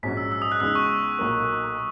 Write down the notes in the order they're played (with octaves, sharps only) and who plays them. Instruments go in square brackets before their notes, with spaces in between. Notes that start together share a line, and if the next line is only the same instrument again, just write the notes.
[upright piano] A#1 G#2 F#3 C#4 F#4 [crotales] B6
[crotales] E6
E6
D#6
F#6
[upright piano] E2 C#3 G#3 D#4 [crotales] E6
[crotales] C#6
[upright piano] B1 A#2 F#3 A#3